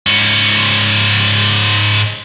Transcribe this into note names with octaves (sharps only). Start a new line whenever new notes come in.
G#2 C#4